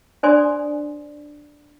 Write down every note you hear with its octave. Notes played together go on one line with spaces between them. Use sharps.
D4 C5 D5 G#5 C6 D#6